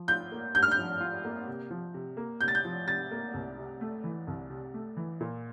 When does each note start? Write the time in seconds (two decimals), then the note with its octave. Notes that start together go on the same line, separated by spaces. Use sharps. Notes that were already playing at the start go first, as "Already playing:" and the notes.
Already playing: F3
0.08 F4 G6
0.32 A#3
0.55 G2 G6
0.63 F6
0.71 G6
0.78 F3
1.01 F4
1.24 A#3
1.47 C3
1.70 F3
1.94 C3
2.17 A#3
2.41 C3 G6
2.48 A6
2.55 G6
2.65 F3
2.87 C3 A6
3.11 A#3
3.34 C2
3.58 C3
3.81 A3
4.04 E3
4.27 C2
4.50 C3
4.74 A3
4.97 E3
5.20 A#2